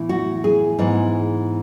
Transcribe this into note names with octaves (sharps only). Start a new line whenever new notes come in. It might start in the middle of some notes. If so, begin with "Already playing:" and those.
Already playing: A2 E3 B3
F#4
G#4
G#2 E3 B3